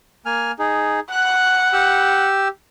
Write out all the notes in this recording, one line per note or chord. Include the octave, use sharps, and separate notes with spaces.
A#3 G#5 F6
D#4 G#4
F#5 F#6
G4 E6